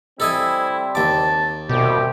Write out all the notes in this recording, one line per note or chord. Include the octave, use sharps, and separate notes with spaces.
G3 C4 E4 A4 D#5 G#5
D#2 A5 D6
C2 B2 G4